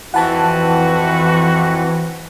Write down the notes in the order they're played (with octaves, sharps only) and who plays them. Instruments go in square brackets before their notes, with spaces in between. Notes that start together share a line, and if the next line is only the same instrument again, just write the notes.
[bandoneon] F2 C4 B4 [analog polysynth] E3 [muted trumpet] F#4 [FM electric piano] F#5 A5